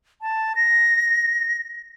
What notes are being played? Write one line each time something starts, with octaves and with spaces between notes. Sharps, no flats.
A5
A#6